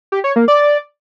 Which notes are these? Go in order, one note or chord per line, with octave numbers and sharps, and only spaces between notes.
G4
C#5
A#3
D5